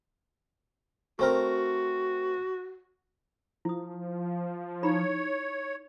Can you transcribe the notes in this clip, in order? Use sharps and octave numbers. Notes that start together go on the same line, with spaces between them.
A3 C4 F#4 A#4
F3 E4 D#6
D#4 E4 C#5 B5